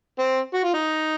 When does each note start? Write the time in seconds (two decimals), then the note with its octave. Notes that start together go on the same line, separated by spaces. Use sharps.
0.19 C4
0.54 F#4
0.64 F4
0.74 D#4